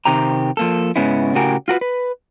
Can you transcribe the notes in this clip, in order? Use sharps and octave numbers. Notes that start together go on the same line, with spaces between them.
C3 D#3 C4 G4 A#5
F3 A#3 A4
G#2 C#3 B3 C#4 E4
A2 C#3 F#4 G4 A#4 G#5
F4 F#4 A#4 B4
B4